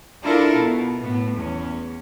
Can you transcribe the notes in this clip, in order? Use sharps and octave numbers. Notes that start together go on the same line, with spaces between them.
D4 E4 F4 A4 A#4
B2
A2 B3
E2 C#4